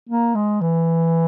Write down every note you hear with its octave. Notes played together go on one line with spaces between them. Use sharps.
A#3
G#3
E3